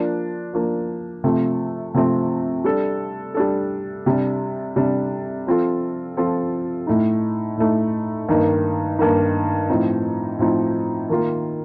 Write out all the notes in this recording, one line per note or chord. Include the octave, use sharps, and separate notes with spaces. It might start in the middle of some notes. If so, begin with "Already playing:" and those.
Already playing: F3 A#3 D4
F3 A#3 D4
C3 F3 A3 C4
C3 F3 A3 C4
G3 D4 A4
G3 D4 A4
C3 G3 D4
C3 G3 D4
F3 C4 F4 A4
F3 C4 F4 A4
A2 A3 D#4
A2 A3 D#4
G2 D#3 A#3 D#4
G2 D#3 A#3 D#4
A2 F3 C4 D#4
A2 F3 C4 D#4
D#3 A#3 F4 A#4